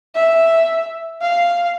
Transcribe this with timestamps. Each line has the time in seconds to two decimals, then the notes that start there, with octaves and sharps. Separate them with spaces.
0.15 E5
1.22 F5